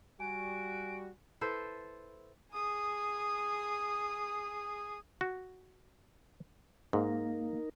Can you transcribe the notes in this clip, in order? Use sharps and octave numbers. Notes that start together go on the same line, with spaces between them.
G3 F#4 G#5 D7
E4 A4 B4 C5
G#4 D#6
F#4
G#2 A#3 D#4 A#4